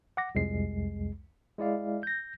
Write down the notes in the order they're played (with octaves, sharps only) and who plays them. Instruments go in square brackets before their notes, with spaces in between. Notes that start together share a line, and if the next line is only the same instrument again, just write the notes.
[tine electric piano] F#5 D6 A#6
C2 F2 G#3 C7
G#3 E4 D5 F5
G6 A#6